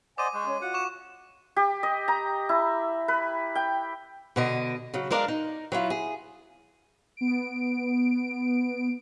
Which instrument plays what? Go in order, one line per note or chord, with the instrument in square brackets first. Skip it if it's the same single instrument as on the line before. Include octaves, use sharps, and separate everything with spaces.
[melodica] C5 D5 D#5 [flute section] F#5 G#5 [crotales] D6 D#7
[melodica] G#3 [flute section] C#6 F#6 G6
[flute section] C#4 C#5
[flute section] F4 F#4 [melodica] F#5
[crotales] C#6 D6 E7
[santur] G4
D#5
A#5
E4
B4
G5
[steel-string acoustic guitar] B2 D3 D#5
C#3 F#3
G#3 D4 A#4 D5 F5
D#4
F#3 E4 F4
G#4
[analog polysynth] B3 D7